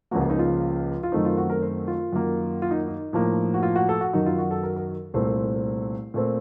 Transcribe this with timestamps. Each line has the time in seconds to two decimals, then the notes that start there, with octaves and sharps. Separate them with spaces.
0.11 C#2 C#3 F3 A#3 F#4
0.21 F4
0.30 D#4
0.39 F4
1.03 F4
1.12 F#2 D#3 A3 C4 D#4
1.25 F4
1.37 F#4
1.50 A#4
1.62 C5
1.88 F4
2.13 F#2 D#3 A#3
2.62 F4
2.71 D#4
2.88 D#4
3.13 A2 F3 A#3
3.54 F#4
3.63 F4
3.76 F#4
3.89 A4
4.01 F#4
4.13 F#2 D#3 F#3 D#4
4.26 F4
4.38 F#4
4.51 A4
4.63 A#4
4.76 A#4
5.14 C2 A#2 A3 C4 C5
6.14 A#2 A3 C4